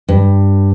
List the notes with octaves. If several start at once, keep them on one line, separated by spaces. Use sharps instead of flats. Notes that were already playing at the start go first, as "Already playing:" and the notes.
G2